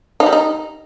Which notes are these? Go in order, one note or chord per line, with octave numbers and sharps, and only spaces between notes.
D#4
G3
D#4